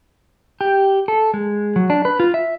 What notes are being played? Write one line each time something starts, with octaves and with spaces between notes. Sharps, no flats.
G4
A4
G#3
F#3
D4
B4
F4
E5